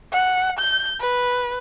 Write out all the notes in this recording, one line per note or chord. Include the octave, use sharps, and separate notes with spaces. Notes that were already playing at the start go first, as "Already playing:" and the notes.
F#5
G6
B4